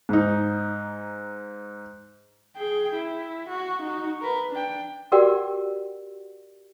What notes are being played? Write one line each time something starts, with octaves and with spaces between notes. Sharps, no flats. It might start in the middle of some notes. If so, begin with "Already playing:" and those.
G#2 D#4
G#4 G5
E4
F#4
D#4 F#4
A#4 B4
D4 G5
F#4 G4 A#4 D5 F#5 G5